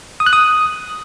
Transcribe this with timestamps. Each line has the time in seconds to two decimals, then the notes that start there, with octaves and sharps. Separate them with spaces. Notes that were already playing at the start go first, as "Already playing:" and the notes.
0.20 D#6
0.26 F#6
0.33 D#6